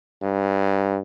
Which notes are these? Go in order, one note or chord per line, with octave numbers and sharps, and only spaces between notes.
G2